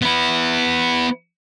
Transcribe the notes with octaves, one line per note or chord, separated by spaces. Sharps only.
B3 E4